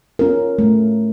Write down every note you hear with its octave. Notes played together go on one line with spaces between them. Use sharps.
C#4 F4 A#4
A3